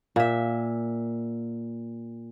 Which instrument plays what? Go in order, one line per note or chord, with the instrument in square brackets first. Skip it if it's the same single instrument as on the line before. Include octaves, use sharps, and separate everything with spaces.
[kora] A#2 E5